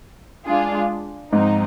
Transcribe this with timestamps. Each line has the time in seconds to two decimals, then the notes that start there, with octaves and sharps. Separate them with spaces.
0.45 G#3 D4 F4 G#4
1.33 G#2 F3 C4 D#4